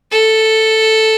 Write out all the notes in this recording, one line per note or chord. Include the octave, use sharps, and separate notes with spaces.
A4